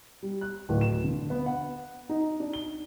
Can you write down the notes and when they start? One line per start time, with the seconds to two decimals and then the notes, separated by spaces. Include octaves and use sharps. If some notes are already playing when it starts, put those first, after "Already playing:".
0.23 G3
0.41 F#6
0.69 D1
0.81 E7
1.04 D3
1.30 B3
1.46 F#5
2.09 D#4
2.40 D4
2.53 G7